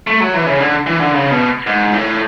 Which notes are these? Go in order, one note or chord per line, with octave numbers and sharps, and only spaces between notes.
A3
F#3
E3
C#3
D3
E3
D3
C#3
B2
G#2
A2